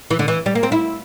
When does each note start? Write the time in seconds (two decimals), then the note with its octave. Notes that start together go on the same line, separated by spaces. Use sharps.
0.10 E3
0.19 D3
0.28 E3
0.46 G3
0.55 A#3
0.63 C4
0.72 E4